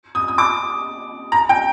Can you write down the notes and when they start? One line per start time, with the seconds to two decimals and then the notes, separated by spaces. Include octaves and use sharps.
0.15 D#6
0.28 D#6
0.38 D6
1.32 A#5
1.49 G5